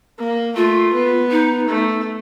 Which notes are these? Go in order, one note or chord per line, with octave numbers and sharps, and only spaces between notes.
A#3
A3 F4
B3
D#4
A3